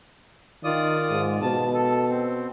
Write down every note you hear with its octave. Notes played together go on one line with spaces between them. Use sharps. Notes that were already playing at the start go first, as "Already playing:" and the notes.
D#3 F4 D5 D#6
G#2
B2 A5
A4
C4